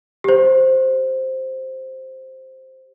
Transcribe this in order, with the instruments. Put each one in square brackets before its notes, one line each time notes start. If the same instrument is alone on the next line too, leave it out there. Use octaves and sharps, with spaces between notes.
[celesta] G4 C5